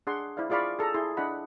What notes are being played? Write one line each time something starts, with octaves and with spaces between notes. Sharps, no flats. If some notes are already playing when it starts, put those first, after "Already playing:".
D4 G#4 F#5 C6
E4 C5 D5 F5
F4 G#4 D5 F5 B5 C#6
G#4 A4 A5 A#5
E4 G#4 C6
D4 E4 D#5 F#5 B5